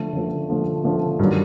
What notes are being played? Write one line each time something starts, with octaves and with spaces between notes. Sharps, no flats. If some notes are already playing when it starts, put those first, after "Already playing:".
Already playing: D3 F3 A3
D3 F3 A3
D3 F3 A3
D3 F3 A3
G2 D#3 F#3